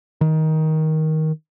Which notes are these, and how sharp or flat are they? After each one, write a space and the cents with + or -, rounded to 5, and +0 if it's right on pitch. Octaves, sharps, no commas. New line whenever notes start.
D#3 +15